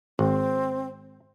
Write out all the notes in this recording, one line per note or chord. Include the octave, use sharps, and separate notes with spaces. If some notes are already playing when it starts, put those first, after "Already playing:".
G#1 C4